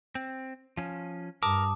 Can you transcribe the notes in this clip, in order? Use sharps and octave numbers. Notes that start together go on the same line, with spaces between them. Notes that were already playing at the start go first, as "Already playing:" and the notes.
C4
F3 C#4
G2 A#4 A5 D6 D#6